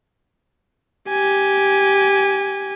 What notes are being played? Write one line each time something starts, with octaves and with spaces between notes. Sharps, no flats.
G4 G#5